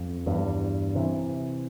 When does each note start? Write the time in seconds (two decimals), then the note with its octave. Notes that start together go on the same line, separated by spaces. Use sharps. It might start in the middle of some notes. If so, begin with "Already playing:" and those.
Already playing: F2
0.26 E2 G2
0.95 C3 E3